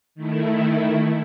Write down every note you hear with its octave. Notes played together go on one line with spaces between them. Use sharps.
D#3 A3 E4